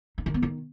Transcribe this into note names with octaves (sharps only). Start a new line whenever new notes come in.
D#4
D#3
B3
D#3